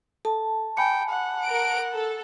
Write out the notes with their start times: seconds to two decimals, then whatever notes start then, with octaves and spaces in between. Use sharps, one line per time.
0.25 A4 A5
0.77 G5 G#5 B5 C#7
1.10 F#5
1.43 A#4 D7
1.91 A4